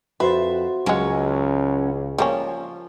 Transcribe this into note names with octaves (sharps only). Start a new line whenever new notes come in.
F2 F#4 B4 C5 E5 A6
C#2 F#3 G#3 A#3 C#4
F3 G3 A#3 C#4